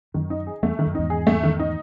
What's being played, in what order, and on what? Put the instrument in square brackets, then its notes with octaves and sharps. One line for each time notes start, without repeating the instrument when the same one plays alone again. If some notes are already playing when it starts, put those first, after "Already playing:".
[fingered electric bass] F#2 [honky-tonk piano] D#3
[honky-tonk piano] D#4
G#4
[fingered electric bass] E2 [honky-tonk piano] A3
[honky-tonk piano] D#3
[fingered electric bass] F#2
[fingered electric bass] E2 G#2 [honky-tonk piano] D#4
[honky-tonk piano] G#4
A3
D#3
D#4